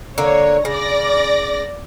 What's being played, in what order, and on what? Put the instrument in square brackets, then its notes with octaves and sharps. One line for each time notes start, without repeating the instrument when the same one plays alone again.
[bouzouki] D3 A#3 [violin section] C#5
[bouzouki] C#3 [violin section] D5 A#6